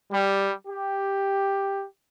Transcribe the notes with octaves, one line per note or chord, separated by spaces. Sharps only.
G3
G4